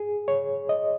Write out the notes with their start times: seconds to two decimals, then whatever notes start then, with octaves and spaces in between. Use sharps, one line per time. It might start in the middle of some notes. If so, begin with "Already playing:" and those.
Already playing: G#4
0.28 C#5
0.69 D#5